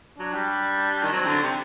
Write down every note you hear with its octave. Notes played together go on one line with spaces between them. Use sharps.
F#3 D4
G3
D#3
F#3 C4
D3
C3